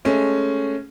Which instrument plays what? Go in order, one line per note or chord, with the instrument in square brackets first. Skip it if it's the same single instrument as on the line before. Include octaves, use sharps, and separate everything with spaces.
[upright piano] G#3 A3 C#4